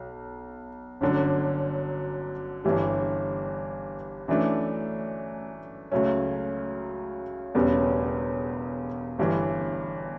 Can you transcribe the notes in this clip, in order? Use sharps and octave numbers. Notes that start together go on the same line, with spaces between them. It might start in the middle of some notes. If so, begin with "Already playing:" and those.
Already playing: B1
G1 F#2 D3 F#3
G1 G2 E3 G3
F#2 E3 A3 D4
C#2 C#3 F#3 A3 C#4
E1 E2 C#3 G3 B3
G1 G2 E3